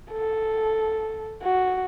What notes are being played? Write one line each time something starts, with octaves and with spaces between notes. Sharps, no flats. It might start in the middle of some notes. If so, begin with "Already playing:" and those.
A4
F#4